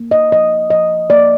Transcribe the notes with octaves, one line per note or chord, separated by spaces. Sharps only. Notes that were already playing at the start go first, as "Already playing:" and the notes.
Already playing: A#3
D#5
F3 D#5
F3 D#5
A#3 D5